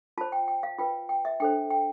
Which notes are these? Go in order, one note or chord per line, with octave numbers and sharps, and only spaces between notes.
F4 C5 A5
G5
G5
F5
F4 B4 G5
G5
E5
D4 A4 C5 G5
G5